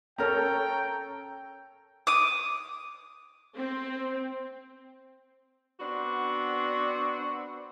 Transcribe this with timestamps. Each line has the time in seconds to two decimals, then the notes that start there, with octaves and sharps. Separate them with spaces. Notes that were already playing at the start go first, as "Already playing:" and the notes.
0.18 C#4 A4 A#4 C#5 G5 A#5
2.07 D6 D#6
3.57 C4
5.80 B3 C4 D4 F#4